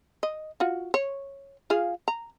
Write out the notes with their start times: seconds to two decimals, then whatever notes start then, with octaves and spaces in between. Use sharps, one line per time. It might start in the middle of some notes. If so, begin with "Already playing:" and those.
0.23 D#5
0.60 F4 F#4
0.94 C#5
1.70 F4 G#4 F5
2.08 A#5